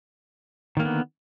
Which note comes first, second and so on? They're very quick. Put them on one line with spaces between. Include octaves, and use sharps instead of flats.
D#3 A#3 D3 B3